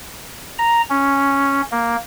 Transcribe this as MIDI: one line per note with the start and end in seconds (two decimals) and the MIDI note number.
0.59 0.82 82
0.90 1.61 61
1.72 1.96 58